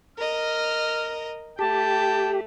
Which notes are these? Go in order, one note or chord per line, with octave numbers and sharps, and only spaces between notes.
A#4 D#5 F6
A3 G4 G5 A5